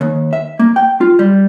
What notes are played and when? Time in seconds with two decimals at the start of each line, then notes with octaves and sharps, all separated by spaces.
0.01 D#2
0.33 E5
0.59 A#3
0.76 G5
1.01 F4
1.19 G3